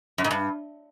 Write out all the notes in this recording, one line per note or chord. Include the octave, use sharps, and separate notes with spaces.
F#2
G#2
G2